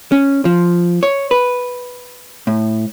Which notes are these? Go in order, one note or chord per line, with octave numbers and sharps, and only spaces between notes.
C#4
F3
C#5
B4
A2